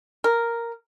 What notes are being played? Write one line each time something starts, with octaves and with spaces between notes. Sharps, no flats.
A#4